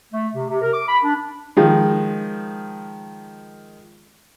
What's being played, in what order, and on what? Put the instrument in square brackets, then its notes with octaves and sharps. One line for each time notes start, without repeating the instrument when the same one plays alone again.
[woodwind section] A3
C3
C3
A#4
D6
B5
D4
[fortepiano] D#3 F3 G#3